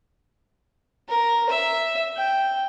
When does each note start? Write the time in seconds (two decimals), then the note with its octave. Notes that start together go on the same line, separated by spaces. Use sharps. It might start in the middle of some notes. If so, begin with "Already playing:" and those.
1.09 A#4
1.50 E5
2.16 G5